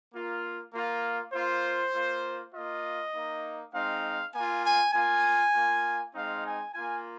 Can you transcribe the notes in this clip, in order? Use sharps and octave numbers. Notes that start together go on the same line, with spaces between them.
A#3 F4
A#3 F4
A#3 F4 C5
A#3 F4
A#3 F4 D#5
A#3 D#4
G#3 C4 D#4 F5
A#3 F4 G#5
G#5
A#3 F4 G#5
A#3 F4
G#3 C4 D#4 F5
G#5
A#3 F4 G#5